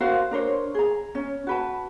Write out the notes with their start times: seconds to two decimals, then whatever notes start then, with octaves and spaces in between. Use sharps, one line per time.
0.01 F#4 A#4 C5 F5
0.31 D4 A#4 C5 C#5
0.74 G#4 A#5
1.15 C#4
1.47 F#4 B4 A5